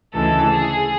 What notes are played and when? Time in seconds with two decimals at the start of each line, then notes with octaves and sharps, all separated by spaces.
0.13 D2 C#3 E3 G#3 A4
0.51 G#4